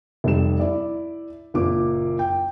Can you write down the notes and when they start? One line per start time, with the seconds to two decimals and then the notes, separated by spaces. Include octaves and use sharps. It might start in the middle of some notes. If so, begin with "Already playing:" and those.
0.24 F1 G3 E7
0.59 E4 D5
1.54 F#1 A#2 D6
2.19 G5